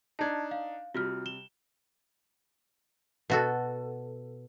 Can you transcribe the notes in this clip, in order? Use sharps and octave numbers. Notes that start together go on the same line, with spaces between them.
D4 D#4 A5 G#6
F5
C3 G3 F4 F#4 F6
E7 G7
B2 F#4 A4